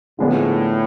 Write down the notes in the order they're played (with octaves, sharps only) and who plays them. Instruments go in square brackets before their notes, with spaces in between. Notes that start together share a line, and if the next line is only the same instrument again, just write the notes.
[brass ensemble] A2 [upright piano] D3 F3 G#3 B3 D4